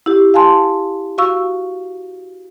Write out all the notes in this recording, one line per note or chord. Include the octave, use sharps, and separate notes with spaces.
E4 G4
F5 G#5 A5 C6
F#4 F5 C#6 E6